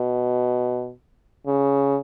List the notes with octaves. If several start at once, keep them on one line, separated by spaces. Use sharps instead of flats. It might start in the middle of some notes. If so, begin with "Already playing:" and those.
Already playing: B2
C#3